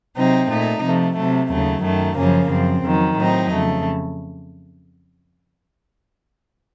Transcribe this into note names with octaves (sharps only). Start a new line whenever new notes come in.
C3 F#3 C4 D#4
A#2 A3 D#4
C3 F3 A3
C3 F#3 A3
D#2 C#3 F#3 A3
F#2 D#3 A3
F#2 C#3 F3 A#3 C#4
F#2 F3 C4
F2 D#3 F#3
A2 F#3 C4 D#4
F2 C#3 A3